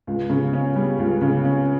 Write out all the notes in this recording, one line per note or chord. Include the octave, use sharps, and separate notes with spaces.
C#2
C#3
C#4
G3
C#2
C#3
C#4